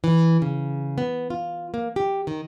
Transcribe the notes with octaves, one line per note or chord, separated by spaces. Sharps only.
E3
C#3
B3
F4
A#3
G4
D#3